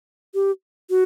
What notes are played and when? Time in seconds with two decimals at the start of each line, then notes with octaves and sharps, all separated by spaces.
0.34 G4
0.90 F#4